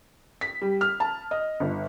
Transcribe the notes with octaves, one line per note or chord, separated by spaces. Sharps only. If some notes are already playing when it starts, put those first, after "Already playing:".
B6
G3
F6
A5
D#5
G1